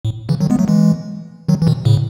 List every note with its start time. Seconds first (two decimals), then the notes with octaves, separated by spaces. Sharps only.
0.05 A2
0.29 C#3 E3
0.41 D#3 F#3
0.50 G#3 B3
0.59 F#3 A3
0.68 E3 G#3
1.48 D#3 F#3
1.62 E3
1.67 B2 D#3
1.85 A2 C#3